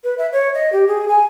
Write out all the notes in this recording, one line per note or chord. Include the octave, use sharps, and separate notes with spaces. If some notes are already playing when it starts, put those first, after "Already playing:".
B4
E5
C#5
D#5
G4
G#4
G#5